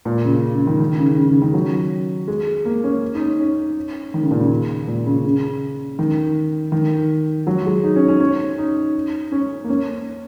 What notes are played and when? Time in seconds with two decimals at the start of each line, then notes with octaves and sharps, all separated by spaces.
0.05 A#2
0.25 C#3
0.55 C#3
0.67 D#3
0.80 D#3
0.98 C#3
1.17 C#3
1.29 C#3
1.42 D#3
1.54 F#3
2.28 G#3
2.65 A#3
2.84 C#4
3.15 D#4
3.20 C#4
3.39 C#4
4.14 D#3
4.22 C#3
4.31 A#2
4.40 C#3
4.88 A#2
5.06 C#3
5.25 C#3
5.99 D#3
6.72 D#3
7.47 F#3
7.66 G#3
7.84 D#4
7.96 C#4
8.08 C#4
8.20 C#4
8.58 D#4
9.32 C#4
9.64 A#3
9.69 C#4